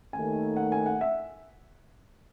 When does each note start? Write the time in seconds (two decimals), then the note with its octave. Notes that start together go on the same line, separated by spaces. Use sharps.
0.13 D#2 D#3 A3 G#5
0.56 F#5
0.72 G#5
0.86 F#5
1.01 E5